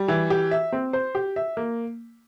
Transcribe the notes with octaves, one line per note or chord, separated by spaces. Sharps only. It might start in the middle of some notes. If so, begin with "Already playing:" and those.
Already playing: G3
E3
G4
E5
C4
C5
G4
E5
A#3